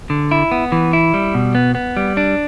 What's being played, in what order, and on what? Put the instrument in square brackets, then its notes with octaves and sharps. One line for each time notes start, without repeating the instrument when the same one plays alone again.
[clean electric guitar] D3
E4
B3
E3
E4
G3
B2
B3
B3
G3
D4